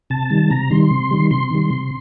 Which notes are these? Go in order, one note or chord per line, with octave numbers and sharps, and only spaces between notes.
C3 A5
D#3 G3
C3 A#5
D#3 G3 C6
C3
D#3 G3
C3 C6
D#3 G3
C3